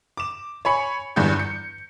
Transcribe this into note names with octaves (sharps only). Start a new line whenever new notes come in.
D6 E7
C#5 G#5 B5 C#7
G1 E2 G2 G6 C#7
C#7